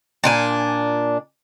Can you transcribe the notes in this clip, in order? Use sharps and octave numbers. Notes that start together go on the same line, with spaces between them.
A#2 D4 G#5